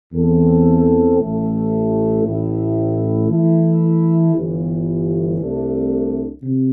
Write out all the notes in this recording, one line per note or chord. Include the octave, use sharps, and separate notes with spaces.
E2 E3 C4 A4
A1 A2 A3
A1 A2 A3 E4
E3 A3 E4
G1 G2 E3
C2 C3 A3 D4
C3